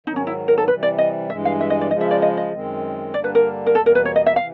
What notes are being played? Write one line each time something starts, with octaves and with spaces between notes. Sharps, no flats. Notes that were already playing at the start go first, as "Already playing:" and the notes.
G#2 D#3 F#3 D#4
C#4
E4
A#4
A4
C3 E3 G3 B4
D5
D#5
G2 E3 G#3 E5
F5
E5
D#5
D5
C#3 F3 G#3 D#5
E5
D5
D#5
D#5
F#2 D#3 G#3 C4
G2 D3 G3 A#3 D4 D5
B4
A#4
A#4
E2 B2 G3 A#3 A4
A#4
B4
C#5
D#5
E5
C3 E3 F5